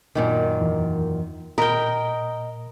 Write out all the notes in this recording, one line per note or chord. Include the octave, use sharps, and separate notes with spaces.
F#2 A#2 D#3
E2 E3
A#2 A#4 D#5 G5 B5